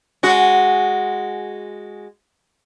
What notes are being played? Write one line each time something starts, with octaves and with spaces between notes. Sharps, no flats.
G#3 F#4